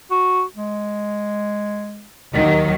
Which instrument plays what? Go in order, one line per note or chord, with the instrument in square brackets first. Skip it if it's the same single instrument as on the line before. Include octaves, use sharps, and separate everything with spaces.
[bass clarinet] F#4
G#3
[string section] D#2 D#3 F#3